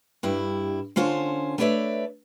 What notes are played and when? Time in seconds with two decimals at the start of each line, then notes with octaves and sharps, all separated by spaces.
0.23 G2 G3 E4
0.96 D3 C#4 F4 C5 C#5 A5
1.58 A3 D4 B4 C#5 D5 E5